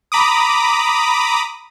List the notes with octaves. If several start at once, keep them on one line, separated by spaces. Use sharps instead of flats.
A#5 B5 D6 D#6